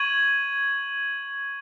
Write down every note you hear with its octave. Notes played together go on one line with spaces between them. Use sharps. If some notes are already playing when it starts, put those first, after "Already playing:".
Already playing: C#6 G#6 D#7 F#7